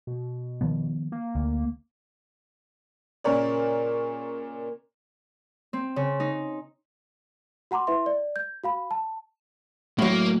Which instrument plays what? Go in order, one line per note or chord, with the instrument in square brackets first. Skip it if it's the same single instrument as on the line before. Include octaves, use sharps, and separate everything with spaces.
[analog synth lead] B2
[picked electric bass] D#3 F3 B3
[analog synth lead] A#3
[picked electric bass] D2
[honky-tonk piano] A#2 C#3 A#4 C#5 D5
[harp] C4
C#3
D#4
[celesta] F#4 F#5 A#5 C6 D6
E4 B4 E5 C6
D5
G6
F#4 F5 B5
A5
[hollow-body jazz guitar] A2 F#3 [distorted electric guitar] A#3